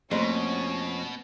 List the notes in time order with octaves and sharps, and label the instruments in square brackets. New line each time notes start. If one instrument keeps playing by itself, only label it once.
[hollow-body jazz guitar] F2 [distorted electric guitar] B2 [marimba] A3 A#3 C6 [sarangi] C#4